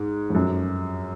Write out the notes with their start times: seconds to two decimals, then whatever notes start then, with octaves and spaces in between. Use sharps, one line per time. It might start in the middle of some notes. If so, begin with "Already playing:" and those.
Already playing: G#2
0.30 F2
0.35 F#2